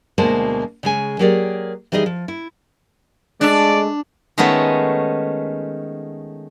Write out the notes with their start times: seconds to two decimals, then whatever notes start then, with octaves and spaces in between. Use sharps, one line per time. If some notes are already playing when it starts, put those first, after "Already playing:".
0.18 D2 B2 G#3 A#3 C5 A5
0.83 C#3 G#3 G#5
1.19 F#3 A#3 G4 G#4 A#4 D5
1.92 E3 G3 D#4 G#4 D#5
2.06 F3
2.28 E4
3.41 G#3 A3 D4 D5 F#6
4.38 D#3 G#3 A3 B3 C#4